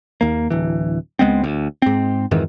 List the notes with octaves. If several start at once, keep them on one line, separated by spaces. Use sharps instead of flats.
D#2 A#3
D1 E3
C#2 G#3 B3 C4
D2
G#2 C4
F2 G#2 D#3 E3